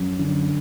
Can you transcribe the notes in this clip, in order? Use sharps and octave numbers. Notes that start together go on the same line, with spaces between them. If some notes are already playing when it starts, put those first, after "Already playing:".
Already playing: F#2
D3